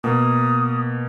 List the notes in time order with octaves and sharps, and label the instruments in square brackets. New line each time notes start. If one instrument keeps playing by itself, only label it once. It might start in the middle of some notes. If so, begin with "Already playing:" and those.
[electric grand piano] B2 A#3 [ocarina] D#6